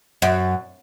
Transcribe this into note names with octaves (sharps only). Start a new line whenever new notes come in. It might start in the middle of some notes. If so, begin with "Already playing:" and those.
F#2